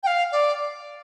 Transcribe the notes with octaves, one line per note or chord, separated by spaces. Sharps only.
G5
F5
D5